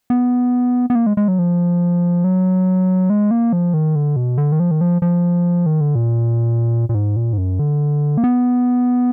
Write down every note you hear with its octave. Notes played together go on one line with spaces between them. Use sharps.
B3
B3
A#3
G#3
G#3
F#3
F3
F#3
G#3
A#3
F3
D#3
D3
B2
D3
D#3
F3
D#3
F3
F3
D#3
D3
A#2
A#2
G#2
A#2
G#2
F#2
D3
A#3
B3